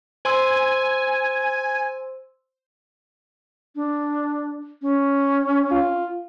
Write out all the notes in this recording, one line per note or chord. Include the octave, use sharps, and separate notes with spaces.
C5 G#5 C6 E6
D4
C#4
F4